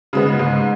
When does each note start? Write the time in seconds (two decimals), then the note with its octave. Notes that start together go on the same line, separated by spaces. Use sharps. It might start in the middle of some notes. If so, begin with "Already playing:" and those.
0.13 C#3 G#3 B3
0.39 G#2